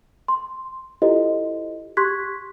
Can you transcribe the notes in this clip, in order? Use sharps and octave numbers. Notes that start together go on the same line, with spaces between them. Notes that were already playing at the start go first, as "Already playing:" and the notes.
C6
E4 F4 G4 A4 C5 D#5
G4 C6 C#6 F#6 G#6 B6